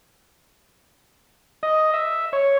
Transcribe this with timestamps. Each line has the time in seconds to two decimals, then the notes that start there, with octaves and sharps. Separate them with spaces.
1.63 D#5
1.94 E5
2.33 C#5